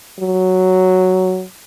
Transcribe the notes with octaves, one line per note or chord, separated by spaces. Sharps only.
F#3